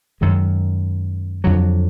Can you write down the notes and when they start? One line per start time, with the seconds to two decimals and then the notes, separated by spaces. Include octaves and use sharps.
0.21 F#2 D#3 G#3
1.44 F2 D3 F#3